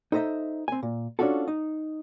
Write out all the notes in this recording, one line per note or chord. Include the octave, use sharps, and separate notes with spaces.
D#4 A4 C5 D#5 E5
C4 G#5
A#2
C#4 D4 F4 F#4 A4
D#4